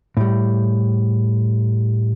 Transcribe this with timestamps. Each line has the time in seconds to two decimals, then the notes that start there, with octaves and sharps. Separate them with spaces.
0.17 A2 G3